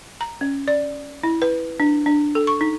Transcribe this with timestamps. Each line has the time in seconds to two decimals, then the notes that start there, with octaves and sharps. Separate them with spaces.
0.21 A#5
0.41 C#4
0.68 D5
1.24 E4
1.42 B4
1.80 D4
2.06 D4
2.35 A4
2.47 C#6
2.61 D#4